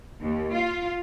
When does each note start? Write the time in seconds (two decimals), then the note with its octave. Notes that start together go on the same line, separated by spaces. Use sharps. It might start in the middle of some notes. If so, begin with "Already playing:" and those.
0.21 D#2
0.54 F4